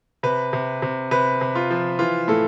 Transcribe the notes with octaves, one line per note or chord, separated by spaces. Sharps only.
C3 B4
C3
C3
C3 B4
C3
F4
F3
E3 F4
A2 A4